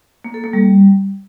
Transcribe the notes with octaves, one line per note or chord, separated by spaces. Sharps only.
A#3
A4
A#3
G3